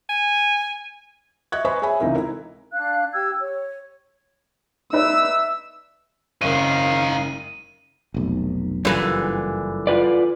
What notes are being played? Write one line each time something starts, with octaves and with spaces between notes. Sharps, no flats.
G#5
D#5 E5 C#6 F#6 G#6
B4 C5 D#5 G#5 B5 C#6
G#4 C#5 E5 G#5 B5
C#2 C3 E3 D#4 A#4 E5
E4 A#4 E5
D4 F5 F#6
G4 E6 G#6
C#5
D#4 B4 D5 E5 E6
F#1 G#2 D#3 C#4 F5 C#6 D#7
F1 B1
F#1 G2 A#2 D3 E3 G#5
F4 B4 D5